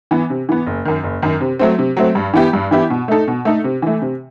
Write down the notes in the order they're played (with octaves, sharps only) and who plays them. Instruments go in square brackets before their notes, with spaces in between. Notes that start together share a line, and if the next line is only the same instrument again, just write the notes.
[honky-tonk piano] E3 B3
C3
E3 B3
F#1
F#2 D#3
F#1
F#2 D#3
C3
F#3 A3 C4
C3
F#3 A3 C4
G2
E3 B3 E4 G4
G2
E3 B3 E4 G4
B2
A3 D#4 A4
B2
A3 D#4 A4
C3
E3 A3
C3